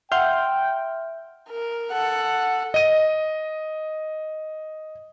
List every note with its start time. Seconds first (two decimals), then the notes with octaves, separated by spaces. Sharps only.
0.12 E5 F#5 G5 C6 F6 G6
1.50 A#4
1.91 A4 F#5
2.74 D#5 D#7